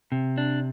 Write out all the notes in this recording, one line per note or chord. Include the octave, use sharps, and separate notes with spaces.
C3
D4